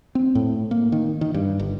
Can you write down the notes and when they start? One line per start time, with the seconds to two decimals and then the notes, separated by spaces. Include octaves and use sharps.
0.15 C4
0.35 A2
0.71 A#3
0.92 D#3
1.21 D#3
1.34 G2
1.59 G1